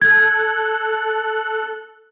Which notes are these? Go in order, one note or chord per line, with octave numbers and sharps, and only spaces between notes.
A4 F#6 G#6